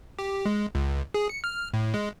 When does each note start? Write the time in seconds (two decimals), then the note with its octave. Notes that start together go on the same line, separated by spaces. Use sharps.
0.19 G4
0.46 G#3
0.75 C#2
1.14 G#4
1.29 C#7
1.44 F6
1.74 A2
1.94 G#3